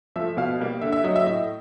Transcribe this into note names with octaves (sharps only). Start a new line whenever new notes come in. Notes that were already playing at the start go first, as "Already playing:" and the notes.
F3 A3 E5
B2 F5
G3 A#3
D3 E5
E5
F#3 A3 D#5
E5
A2 D#5